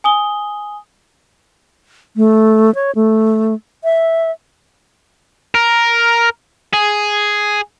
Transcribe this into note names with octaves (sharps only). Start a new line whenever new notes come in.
G#5 D#6 G7
A3
C#5
A3
E5
A#4
G#4